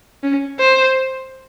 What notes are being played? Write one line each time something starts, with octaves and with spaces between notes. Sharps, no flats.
C#4
C5